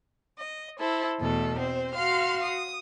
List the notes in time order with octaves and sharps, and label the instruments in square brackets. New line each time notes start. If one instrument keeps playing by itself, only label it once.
[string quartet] D#5
E4 A4 C5
E2 B2 A3 A4
C4 C5
F#4 F5 C6 F6
D#6